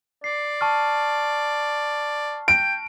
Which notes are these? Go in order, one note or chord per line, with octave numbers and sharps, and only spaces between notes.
D5 C7
A5 C#6 F6
G5 D7